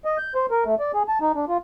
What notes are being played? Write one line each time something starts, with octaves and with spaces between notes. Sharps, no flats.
D#5
G6
C5
A#4
A3
D5
G#4
A5
D#4
D4
F4